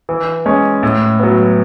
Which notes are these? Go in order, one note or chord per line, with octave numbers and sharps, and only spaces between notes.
E3
G#3 C#4
A2
F#3 B3